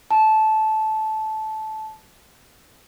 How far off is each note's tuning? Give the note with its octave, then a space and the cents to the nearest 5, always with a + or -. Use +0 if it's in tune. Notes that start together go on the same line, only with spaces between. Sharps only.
A5 -15